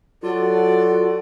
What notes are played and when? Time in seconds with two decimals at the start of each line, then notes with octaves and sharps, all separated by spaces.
0.23 F#3 F4 F#4 A4 D5